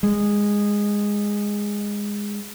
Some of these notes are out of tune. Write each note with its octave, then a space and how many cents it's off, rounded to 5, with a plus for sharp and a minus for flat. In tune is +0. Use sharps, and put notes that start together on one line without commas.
G#3 -10